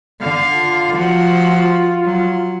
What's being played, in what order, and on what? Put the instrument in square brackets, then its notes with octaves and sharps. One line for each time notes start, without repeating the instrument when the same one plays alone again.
[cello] D3 F5
[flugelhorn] F4
[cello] F3 F#4
F#3